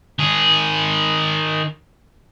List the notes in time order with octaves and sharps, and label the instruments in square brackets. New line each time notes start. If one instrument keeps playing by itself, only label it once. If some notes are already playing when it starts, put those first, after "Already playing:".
[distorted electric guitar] D#3 G#4